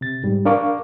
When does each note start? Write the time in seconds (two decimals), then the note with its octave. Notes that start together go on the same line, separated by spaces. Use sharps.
0.01 C3 A6
0.24 G#2 G3
0.45 D4 A#4 F5 C#6 D6